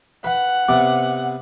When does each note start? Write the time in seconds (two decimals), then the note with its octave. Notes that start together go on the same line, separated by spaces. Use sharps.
0.24 B4 F#5
0.68 C3 B3 D5